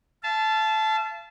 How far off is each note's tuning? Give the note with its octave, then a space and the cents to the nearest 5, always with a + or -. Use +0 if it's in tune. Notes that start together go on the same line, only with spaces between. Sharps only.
F5 -45 A5 -15